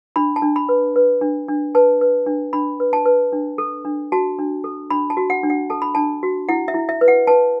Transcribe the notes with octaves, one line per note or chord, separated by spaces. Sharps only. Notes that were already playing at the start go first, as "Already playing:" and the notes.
D4 B5
A5
D4
B5
B4
B4
D4
D4
B4 A5
B4
D4
D4 B5
B4
A5
B4
D4
A4
D4
F#4 A5
D4
A4
D4 B5
A5
F#4
F#5
D4
F#5
A4 A5
B5
D4 A5
F#4
E4 F#5
E5
E4
E5
B4
F#5
B4 A5